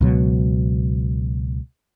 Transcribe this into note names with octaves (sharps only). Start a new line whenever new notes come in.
C#2 B2 F#3